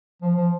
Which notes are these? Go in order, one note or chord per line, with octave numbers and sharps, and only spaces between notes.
F3
F3